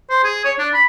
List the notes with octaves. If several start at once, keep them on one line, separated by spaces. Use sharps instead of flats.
C5
G#4
C#5
D4
B5